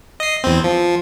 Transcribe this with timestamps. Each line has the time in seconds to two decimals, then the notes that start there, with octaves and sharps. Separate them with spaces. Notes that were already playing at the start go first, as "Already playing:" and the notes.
0.20 D#5 C7
0.44 E2 C4
0.64 F3